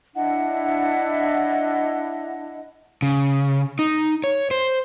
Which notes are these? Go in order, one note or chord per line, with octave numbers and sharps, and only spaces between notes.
D4 E4 D#5 F#5
C#3
D#4
C#5
C5